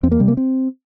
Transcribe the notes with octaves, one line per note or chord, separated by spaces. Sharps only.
E2 C4
A#3
C3 G3
A#3
C4